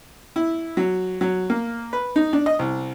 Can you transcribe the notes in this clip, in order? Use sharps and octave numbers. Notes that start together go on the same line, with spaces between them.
E4
F#3
F#3
A#3
B4
D#4
D4
D#5
C2